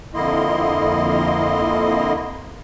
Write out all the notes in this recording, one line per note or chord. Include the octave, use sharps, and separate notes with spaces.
F2 D3 A#3 E4 D#5 C6